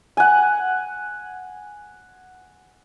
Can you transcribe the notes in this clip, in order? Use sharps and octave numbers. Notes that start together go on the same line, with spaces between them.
F#5 G#5